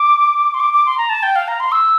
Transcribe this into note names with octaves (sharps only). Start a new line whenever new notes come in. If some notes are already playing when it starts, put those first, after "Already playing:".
Already playing: D6
C6
D6
D6
C6
A#5
A5
G5
F5
A#5
C6
E6